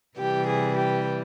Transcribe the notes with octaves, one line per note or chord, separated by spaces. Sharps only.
C3 E3 G3 G4
G#4
G4